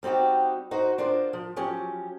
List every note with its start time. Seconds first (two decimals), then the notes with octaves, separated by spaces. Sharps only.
0.03 G3 C4 D#4 F#4 G4
0.71 D#4 F#4 C5
0.98 D4 F4 A#4 C5
1.33 F3
1.56 F3 F#3 C#4 G4